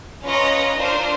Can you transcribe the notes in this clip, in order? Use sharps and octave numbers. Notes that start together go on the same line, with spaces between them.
C#4 F4 B4 C#5 D#5 A#5
D4 F4 A#4 C5